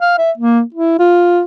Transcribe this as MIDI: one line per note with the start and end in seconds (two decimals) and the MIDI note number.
0.01 0.15 77
0.18 0.31 76
0.38 0.62 58
0.75 0.99 64
0.99 1.42 65